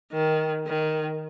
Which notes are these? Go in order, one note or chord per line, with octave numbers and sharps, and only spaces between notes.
D#3
D#3